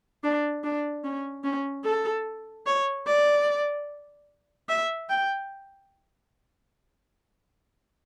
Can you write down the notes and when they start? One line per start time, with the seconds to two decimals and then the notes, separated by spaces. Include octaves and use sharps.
0.24 D4
0.64 D4
1.04 C#4
1.44 C#4
1.85 A4
2.66 C#5
3.07 D5
4.69 E5
5.10 G5